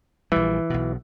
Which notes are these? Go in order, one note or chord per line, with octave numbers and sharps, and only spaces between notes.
A#1 E3 G3
B1 B2